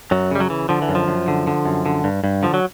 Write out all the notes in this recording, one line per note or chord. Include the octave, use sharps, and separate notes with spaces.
F#2 F#3
C#3 G3
F#3
E3
D3 F3
E3
F#2
F3
F#2
D3
D3
F#2
D3
G2
G2
D3 F3
F#3